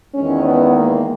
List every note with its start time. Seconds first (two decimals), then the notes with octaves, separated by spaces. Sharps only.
0.14 E2 D#3 G#3 C#4
0.45 B3
0.77 A#3